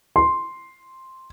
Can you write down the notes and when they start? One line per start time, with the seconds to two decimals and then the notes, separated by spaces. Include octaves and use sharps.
0.16 C6